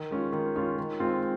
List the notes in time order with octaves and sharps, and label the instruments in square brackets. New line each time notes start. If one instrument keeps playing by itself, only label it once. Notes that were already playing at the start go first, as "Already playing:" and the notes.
Already playing: [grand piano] D#3
G#3 C#4 F4
D#3
G#3 C#4 F4
D#3
G#3 C4 F4